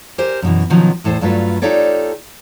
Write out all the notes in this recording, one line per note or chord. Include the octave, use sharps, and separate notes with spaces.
G4 A#4 C5 G#5
F#2 B2 E3
B2 D#3 F3 F#3 C#4
E2 A2 A4 B4 C5
G2 F#3 A3 F4 B4
D#4 F4 G4 A4 C#5 D5